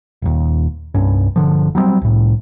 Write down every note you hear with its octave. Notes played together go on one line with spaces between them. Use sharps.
D#1 D#2
C2 G2 C#4
G1 D3 F3
F#3 G3 A3 C4
C2 A2